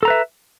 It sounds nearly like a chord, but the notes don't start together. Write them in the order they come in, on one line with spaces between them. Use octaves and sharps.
A4 A#5 B4 E5